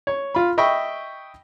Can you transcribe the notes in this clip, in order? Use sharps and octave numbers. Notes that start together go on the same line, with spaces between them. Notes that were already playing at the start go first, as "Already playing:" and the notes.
C#5
F4 B5
D#5 E5 G5 B5 C#6